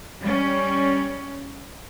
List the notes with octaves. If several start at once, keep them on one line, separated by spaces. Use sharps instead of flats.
G3 C#4